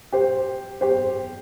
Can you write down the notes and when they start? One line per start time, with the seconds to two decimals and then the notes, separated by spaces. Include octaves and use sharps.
0.12 G4 C5
0.81 G4 C5